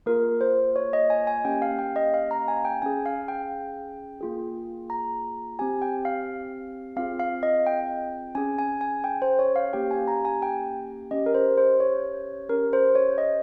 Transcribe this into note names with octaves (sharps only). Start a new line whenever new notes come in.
A#3 F4 G#4 A#4
C5
C#5
D#5
G#5
G#5
A#3 C#4 G4 G5
F5
G5
D#5
F5
A#5
G#5
G5
C#4 G#4 G#5
F5
G5
A#3 F4 G#4
A#5
C4 G4 G#5
G5
F5
C4 F4 G#4 F5
F5
D#5
G5
C#4 G#4 G#5
G#5
G#5
G5
C5
C#5
F5
A#3 C#4 G4 G5
G#5
A#5
G#5
G5
C#4 G4 D#5
A#4
C5
C5
C#5
C#4 G4 A#4
C5
C#5
D#5